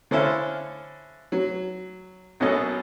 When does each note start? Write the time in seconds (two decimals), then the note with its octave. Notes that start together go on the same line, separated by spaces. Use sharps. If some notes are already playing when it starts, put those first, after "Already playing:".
0.11 D3 C#4 E4 A4 C5 F5
1.32 F#3
2.40 A#1 B2 F#3 C#4 A4 D#5